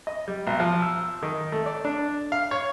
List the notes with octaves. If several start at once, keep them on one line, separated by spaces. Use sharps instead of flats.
D#5
G3
B1
F3
E6
D#3
A3
D5
D4
F5
C#5